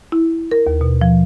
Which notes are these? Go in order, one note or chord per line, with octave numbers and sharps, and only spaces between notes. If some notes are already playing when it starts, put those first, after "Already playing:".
E4
A#4
D#2
B2
F3